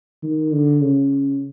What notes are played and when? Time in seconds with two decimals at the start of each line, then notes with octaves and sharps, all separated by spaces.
0.23 D#3
0.52 D3
0.81 C#3